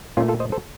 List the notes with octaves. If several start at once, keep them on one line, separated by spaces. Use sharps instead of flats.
A#2 A3 C#4 F4
F4 A4
C5 D#5
A4 C5